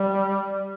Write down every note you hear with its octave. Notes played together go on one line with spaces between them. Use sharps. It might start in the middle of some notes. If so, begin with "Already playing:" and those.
Already playing: G3